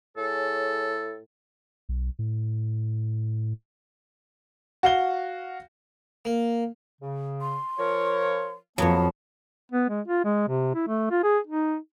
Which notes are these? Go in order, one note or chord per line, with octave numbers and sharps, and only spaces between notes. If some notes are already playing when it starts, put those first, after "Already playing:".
A2 G#4 A4 C#5
B1
A2
F#4 F5 G7
A#3
C#3
C6
F3 A#4 C#5
F2 F3 F#3 A#3 B3 C#5 A5
B3
G#3
F4
G#3
C3
E4
A3
F4
G#4
D#4